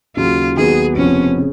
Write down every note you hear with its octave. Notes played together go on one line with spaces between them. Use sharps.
D#2 C#3 F#3 C#4 F4 F#4
D#2 D#3 F#3 B3 F#4 G#4
F1 F2 C#3 F3 B3 C#4
C#3